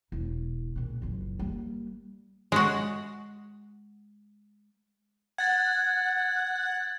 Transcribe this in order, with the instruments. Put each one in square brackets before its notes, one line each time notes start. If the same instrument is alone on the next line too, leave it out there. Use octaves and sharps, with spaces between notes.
[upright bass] E1 E4
A#2 C#3
F#1 C#2
G3 A#3
[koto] G#3 F#4
[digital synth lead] F#5 [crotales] G#6 A6